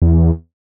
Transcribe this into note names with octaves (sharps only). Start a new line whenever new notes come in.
E2